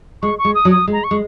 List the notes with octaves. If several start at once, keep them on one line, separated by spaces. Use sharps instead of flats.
G#3 C#6
C#6
G#3
D#6
F#3
D#6
G#3
A#5
C#6
G#3